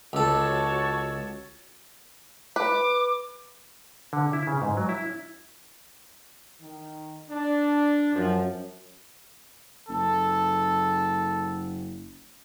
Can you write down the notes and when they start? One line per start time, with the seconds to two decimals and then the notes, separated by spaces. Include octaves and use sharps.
0.13 C#2 F#4 A4 C#5 A5
2.56 B4 D6
4.13 D3
4.33 E4
4.47 C#3
4.62 G#2
4.77 F#3
4.89 E4
6.61 D#3
7.30 D4
8.15 F#2 F3
9.89 F#1 A4